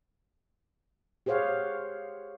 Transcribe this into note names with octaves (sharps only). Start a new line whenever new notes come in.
G4 G#4 C5 C#5 F5 F#5